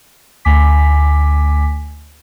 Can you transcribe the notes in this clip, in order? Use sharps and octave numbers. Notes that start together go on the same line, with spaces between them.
D2 G#5 D6 B6